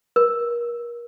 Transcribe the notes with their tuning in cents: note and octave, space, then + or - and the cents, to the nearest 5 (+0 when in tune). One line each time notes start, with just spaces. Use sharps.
A#4 +30